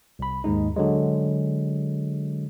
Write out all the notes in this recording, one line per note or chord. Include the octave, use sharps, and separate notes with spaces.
C2 B5
D#2 G#2 G#3 D#4
D3 F#3 G#3